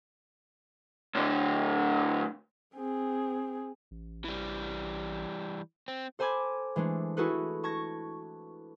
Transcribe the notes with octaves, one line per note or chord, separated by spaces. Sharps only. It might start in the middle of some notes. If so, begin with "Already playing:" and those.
A2 D3
C4 G#4
A1
E3 G3
C4
A4 C5 G#5 B5 D6 G#6
E3 G#3 A3 D4
E4 F#4 G#4 A4 B4
A5 C#6 G#6 A#6